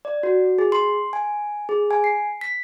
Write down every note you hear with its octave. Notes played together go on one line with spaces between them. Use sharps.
D5
F#4
G#4
C6
G#5
G#4
G#5
C7
B6